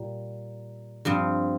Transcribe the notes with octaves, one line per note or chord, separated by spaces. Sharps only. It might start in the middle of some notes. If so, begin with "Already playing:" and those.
Already playing: A#2 G3
G2 F3 C4